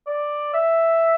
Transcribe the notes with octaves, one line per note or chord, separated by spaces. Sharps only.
D5
E5